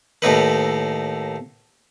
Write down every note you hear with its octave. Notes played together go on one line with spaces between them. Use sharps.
D#2 A2 D#4 B4